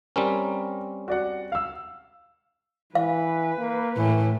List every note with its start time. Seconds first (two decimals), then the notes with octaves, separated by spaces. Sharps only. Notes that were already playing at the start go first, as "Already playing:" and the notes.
0.16 G3 C4 C#4 A#4
1.08 F#4 D5 F#5
1.52 F5 E6
2.95 E3 B4 F5
3.59 A#3
3.97 A2 E3